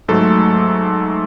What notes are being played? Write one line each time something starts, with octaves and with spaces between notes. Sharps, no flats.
G#2 F#3 A3 A4